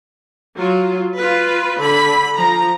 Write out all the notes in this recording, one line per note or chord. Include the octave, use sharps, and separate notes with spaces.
F#3 F4
F4 B4
D3 B5
F3 A#5